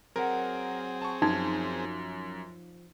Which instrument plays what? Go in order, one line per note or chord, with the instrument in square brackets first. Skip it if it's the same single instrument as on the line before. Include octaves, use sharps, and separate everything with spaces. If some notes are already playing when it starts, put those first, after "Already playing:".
[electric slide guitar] F#3 F#5 [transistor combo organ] C4 G#4 [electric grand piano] A#4
[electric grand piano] A5 C#6
[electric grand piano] F#2 [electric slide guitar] F3 F4 [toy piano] D#4